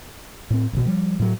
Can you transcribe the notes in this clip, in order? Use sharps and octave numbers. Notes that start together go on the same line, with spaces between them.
A2 C4
A1 B2
F3 G3
A2 F#3